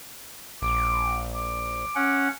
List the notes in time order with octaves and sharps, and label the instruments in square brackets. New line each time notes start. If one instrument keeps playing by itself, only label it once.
[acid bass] A#1 [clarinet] D6
[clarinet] D6
[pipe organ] C#4 F#5